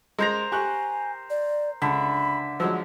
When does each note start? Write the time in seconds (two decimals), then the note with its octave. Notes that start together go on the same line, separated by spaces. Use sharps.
0.18 G#3 A#4 C5 A#5
0.52 G4 G#5 C#6 F#6
1.30 D5
1.82 C#2 D3 E5 B5
2.60 F3 F#3 G#3 E6